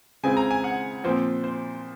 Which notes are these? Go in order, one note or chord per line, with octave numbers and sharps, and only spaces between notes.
C#3 G#3 C4 F4 G#4 G#5
A#5
G#5
F#5
A#2 F3 C4 C5
C5